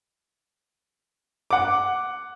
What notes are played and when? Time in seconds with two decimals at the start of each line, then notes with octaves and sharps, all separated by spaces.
1.51 F#5 D6